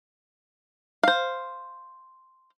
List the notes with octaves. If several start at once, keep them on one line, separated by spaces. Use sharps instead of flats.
C5 F5